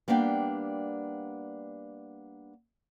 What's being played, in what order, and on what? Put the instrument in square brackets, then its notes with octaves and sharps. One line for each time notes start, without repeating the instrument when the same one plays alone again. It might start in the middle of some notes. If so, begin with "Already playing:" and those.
[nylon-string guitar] G3 A#3 B3 D4 F5 G5